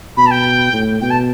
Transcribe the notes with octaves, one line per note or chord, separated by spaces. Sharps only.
B2 B5
A5
G5
A2
B2 G5
A5